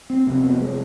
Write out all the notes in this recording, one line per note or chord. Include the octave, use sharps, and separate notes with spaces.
C4
F1 F2 C3 C4
B3
G#3